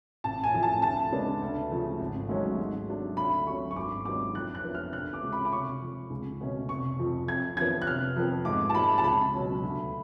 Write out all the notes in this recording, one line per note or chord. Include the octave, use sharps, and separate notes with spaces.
A1 A5
G#5
A2 F3
A5
D2 A5
C#3 G#3 B3 D4
D2
C#3 F3 A3
G#1
G#2 F#3 A3 C#4
G#2
F#3 A3 D4
D2 B5
D3 F#3 C#4 C#6
C#6
G#1 D6
G#2 F#3 B3 D4 D6
F2 F#6
F#6
F3 B3 D4
F6
D2 F#6
D6
C#3 G#3
B5
D6
F1 C#6
F2 F3
C#2
B2 A3 C#4
F1 C#6
F2 F3
F2 G#6
D3 F3 B3 G#6
F#6
F1 F6
F2 F3 B3
G#2 D6
A5
F3 G#3 B5
A5
C#2 B5
B2 F#3 C#4
D2